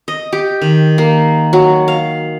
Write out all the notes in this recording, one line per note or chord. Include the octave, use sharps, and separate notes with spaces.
D#5
G4
D#3
A#3
F#3
F5